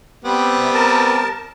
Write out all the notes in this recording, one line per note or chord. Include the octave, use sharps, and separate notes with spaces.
G3 B3 C4
C3
A#4 A5